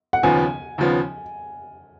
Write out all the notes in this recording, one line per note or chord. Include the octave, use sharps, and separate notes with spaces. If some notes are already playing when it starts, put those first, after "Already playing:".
F#5
D#2 C#3 F3 B3 G#5
D#2 C#3 F3 B3